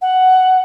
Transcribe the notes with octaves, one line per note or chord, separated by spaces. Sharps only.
F#5